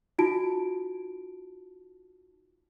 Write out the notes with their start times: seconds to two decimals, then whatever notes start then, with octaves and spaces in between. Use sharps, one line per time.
0.18 D#4 F4 F#4 A5 D7